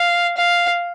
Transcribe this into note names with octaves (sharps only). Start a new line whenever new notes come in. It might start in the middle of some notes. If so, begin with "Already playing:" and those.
Already playing: F5
F5